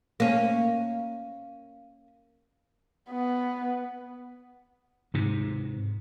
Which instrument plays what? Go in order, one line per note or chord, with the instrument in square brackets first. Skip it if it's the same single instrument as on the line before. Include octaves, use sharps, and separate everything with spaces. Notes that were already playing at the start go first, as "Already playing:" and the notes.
[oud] A#3 C#4
[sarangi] B3
[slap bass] G#2 C3